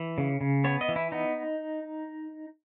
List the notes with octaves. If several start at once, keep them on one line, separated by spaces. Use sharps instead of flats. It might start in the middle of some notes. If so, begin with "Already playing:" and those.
Already playing: E3
C#3
C#3
B3 C#5
D#5
E3
E4
B3 D#4